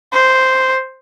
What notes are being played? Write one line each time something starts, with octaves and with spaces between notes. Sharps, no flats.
C5